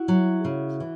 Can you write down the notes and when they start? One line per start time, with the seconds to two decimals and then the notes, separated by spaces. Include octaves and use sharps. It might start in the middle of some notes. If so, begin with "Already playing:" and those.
Already playing: E4 F#4
0.08 F#3
0.45 C#3
0.80 E3